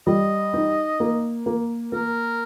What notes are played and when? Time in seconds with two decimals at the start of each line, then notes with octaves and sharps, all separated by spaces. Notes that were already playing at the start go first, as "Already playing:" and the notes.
0.07 G3 D#5
0.54 D#4
1.00 A#3
1.46 A#3
1.92 A#3 A#4